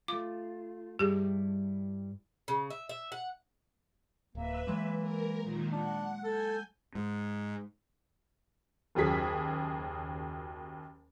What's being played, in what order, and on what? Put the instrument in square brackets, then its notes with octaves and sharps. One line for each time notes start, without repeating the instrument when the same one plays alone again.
[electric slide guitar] A3 F4 [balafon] D6
[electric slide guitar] G2 G3 E4 [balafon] G4 G#4
[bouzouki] C#3
E5
E5
F#5
[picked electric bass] D1 [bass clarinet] A#3 [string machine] B4 E5
[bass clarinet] E3 [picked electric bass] F#3 G#3 A#3
[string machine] A#4
A#2 D#3
[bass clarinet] D4 [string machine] F#5
[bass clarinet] A4 [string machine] G#5 G6
[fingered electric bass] G#2
[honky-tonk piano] F#1 D#2 F#3 G#4 B6